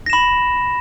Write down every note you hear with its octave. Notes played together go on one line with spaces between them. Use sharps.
B5 A#6 E7